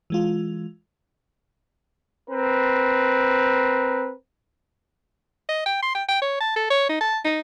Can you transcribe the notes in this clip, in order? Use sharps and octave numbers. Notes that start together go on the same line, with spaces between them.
E3 G#3 F4
C4 A#4 B4
D#5
G5
C6
G5
G5
C#5
A5
A4
C#5
D#4
A5
D#4